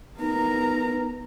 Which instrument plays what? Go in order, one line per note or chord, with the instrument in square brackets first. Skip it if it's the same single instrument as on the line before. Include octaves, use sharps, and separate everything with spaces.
[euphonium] B3 [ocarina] D#4 [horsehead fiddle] A#4 A#5